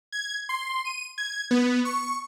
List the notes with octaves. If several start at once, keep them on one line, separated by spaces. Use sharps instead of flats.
G#6
C6
D#7
G#6
B3
C#6